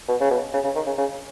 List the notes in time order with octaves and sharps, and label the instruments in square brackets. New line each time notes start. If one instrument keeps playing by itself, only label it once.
[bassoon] B2
C#3
B2
C#3
C#3
D#3
C#3
C#3